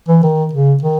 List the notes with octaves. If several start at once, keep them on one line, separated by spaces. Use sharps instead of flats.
E3
D#3
C#3
D#3